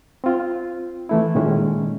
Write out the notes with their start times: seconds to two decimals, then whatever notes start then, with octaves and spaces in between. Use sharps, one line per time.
0.24 C4 F4
1.09 E3 A3 E4
1.35 A#2 D#3 G#3 C#4